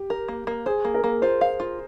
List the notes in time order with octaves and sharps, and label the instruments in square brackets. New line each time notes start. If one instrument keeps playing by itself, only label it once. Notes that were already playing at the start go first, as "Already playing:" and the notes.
Already playing: [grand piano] G4
[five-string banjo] A#4
A#3
A#3
[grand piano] G#4 [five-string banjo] C5
[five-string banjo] A#3
[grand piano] A#4
[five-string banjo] A#3
[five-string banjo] F4 [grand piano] C5
[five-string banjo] F5
F4